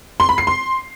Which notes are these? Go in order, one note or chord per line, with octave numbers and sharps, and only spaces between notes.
C6
B5
C7
C6